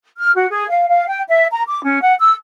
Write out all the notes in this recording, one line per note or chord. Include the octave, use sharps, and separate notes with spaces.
F6
F#4
G#4
F5
F5
G5
E5
A#5
D6
C#4
F#5
E6